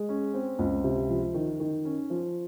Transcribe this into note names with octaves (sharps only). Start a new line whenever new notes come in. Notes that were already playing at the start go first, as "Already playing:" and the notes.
Already playing: G#3
C#4
C4
C#2
C3
F3
D#3
D#3
C#4
F3